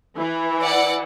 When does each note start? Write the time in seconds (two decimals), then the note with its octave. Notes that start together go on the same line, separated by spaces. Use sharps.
0.18 E3
0.63 D5 F#5